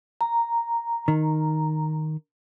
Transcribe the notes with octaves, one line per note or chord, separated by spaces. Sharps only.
A#5
D#3